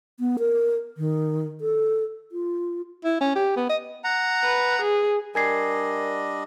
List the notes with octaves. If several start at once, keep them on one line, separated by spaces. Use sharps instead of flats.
B3
A#4
D#3
A4
F4
E4
C#4
G4
B3
D#5
F#5 A#5
B4
G#4
G3 D4 A#4 D#5 G#5 G#6 C7